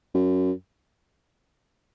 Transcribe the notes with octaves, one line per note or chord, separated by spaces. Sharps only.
F#2